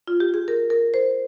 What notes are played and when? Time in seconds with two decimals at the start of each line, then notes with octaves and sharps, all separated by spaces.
0.08 F4
0.20 G4
0.34 G#4
0.48 A#4
0.70 A#4
0.94 C5